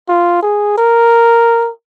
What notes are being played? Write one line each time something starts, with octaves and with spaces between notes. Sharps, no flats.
F4
G#4
A#4